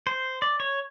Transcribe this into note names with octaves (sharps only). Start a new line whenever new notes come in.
C5
D5
C#5